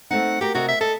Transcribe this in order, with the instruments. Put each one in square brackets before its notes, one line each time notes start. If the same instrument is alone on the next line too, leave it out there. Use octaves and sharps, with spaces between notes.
[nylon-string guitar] A3 C4 D#4 [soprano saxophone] F#5
[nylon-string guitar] F#4 A#4 [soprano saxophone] G4
[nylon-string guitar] C3 A#4 D#5 [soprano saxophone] F#4
[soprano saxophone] E5
[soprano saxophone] A4 [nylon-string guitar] D#5